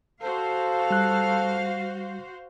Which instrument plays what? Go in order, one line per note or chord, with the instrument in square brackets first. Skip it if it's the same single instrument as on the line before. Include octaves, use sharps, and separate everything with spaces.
[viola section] F#4 C5 [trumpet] A4 [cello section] F5
[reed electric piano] G3 F#6